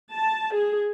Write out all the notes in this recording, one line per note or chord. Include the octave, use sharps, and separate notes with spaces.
A5
G#4